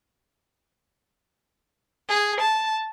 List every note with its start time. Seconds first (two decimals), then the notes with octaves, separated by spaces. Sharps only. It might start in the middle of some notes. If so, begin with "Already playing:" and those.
2.09 G#4
2.40 A5